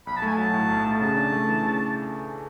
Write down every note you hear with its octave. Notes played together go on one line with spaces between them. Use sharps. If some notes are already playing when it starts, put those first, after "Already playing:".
B1 B5
A5
A3 G#5
F#3 A5
A2
B1
A3
C#3 A5
D4
A3
E3
C#3